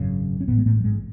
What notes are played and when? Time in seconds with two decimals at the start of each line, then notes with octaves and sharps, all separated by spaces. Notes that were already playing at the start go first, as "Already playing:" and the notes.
Already playing: G#1 F#2 C#3
0.40 C#4
0.48 A1 B2 B3
0.51 A2
0.58 G#3
0.66 A2 A3
0.80 F#3
0.84 G#2 G#3